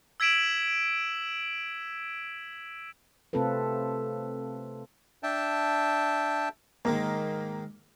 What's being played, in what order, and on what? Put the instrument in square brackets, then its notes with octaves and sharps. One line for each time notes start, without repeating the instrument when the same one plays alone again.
[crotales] E6 G#6 B6 D7 E7 F#7
[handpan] C3 A3 C4 F4 A4 B4
[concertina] D4 E5 G5 A5
[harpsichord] G#2 D#3 G#3 [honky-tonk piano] A#3